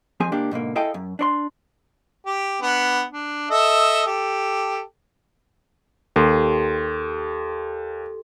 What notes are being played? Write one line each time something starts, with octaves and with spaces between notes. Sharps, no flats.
F2 C4 G#4 G#5
C#2 A#3 D4 G4
G#2 B2 D3 A#3
E4 G#4 A4 D#5 F5 G5
F#2
D4 C#5 C6
G4
B3 D4
D4
A4 D#5 E5
G4 A4
D#2 G4 A4 C6